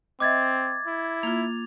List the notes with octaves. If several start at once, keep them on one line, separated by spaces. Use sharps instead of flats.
C4 D#5 E5 D6 G#6 A6
E4
A#3 F4 F7